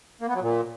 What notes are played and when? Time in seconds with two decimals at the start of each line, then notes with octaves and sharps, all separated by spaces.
0.21 A#3
0.28 B3
0.35 F#3
0.42 A#2